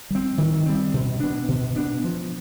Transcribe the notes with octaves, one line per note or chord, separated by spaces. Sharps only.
G3 C4
D#3
G3 C4
B2
B3 D4
B2
B3 D4
F3